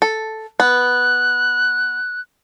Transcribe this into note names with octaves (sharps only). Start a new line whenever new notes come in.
A4
B3 F#6